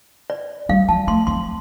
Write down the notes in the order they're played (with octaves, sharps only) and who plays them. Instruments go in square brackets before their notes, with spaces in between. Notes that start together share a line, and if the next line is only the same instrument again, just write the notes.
[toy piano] D5
[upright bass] G3 [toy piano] F5
[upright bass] F3 [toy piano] A5
[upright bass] A3 [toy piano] C6
[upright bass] C4 [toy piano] C6